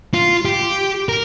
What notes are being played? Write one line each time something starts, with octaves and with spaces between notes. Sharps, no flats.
F4
G4
A#4